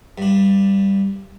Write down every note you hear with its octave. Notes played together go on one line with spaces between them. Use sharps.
G2 D4